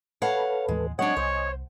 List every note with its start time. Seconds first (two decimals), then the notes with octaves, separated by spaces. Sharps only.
0.22 A4 B4 C#5 F5 F#5
0.68 D#2 A2 E3 G#3
0.99 F#3 G#3 C4 D4 C#5 D#5 F#5 G#5
1.17 C2 C5